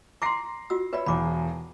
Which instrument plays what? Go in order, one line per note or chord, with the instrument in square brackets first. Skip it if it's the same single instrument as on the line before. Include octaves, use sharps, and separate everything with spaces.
[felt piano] A#5 A#6 C7 [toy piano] C6 D6
[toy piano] F4 F#4 E6
[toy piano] B4 D5 [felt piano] C#5 E5 B5
[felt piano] E1 E2 [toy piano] B5 D6